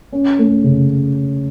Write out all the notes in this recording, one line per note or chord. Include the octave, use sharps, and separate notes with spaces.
C#4
A3
C#3